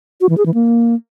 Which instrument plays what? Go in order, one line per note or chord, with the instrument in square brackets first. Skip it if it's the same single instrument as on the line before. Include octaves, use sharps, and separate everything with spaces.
[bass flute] F#4
E3
G#4
E3
A#3